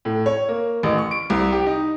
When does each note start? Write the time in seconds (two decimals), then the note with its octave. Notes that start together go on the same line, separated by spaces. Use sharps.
0.05 A2
0.26 C#5
0.48 A#3
0.83 A1
0.98 C#6
1.11 D7
1.30 C2
1.52 G4
1.66 D#4